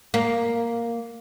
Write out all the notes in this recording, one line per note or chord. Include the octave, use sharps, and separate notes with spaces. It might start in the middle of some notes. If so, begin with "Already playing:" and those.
A#3